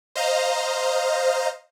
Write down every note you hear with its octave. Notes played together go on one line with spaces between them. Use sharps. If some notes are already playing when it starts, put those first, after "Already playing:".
C5 D#5 F5 A#5